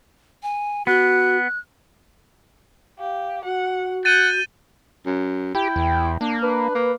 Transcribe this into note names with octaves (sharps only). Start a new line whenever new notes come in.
G#5
B3 F#4 F#6
G4 F5
F#4 F#5
F#5 G6 A6 D#7
F#2
E4 G4 G5
E2
A#3 D4
D4 B4
A#3